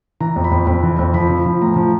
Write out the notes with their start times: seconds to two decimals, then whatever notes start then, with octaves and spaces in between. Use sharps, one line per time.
0.20 E3 A#5
0.36 F2
0.44 B5
0.51 F2
0.67 F2 B5
0.83 E3
0.99 F2
1.14 F3 B5
1.30 F3
1.46 F3
1.61 A2 A#5
1.76 F3